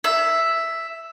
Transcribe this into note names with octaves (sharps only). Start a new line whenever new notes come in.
E5